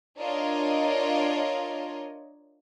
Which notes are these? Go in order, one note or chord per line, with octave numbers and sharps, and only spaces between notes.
D4 F4 A#4 C#5 D#5